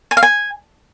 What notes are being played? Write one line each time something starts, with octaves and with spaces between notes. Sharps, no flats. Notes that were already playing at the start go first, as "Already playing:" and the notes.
G#5
F5
G#5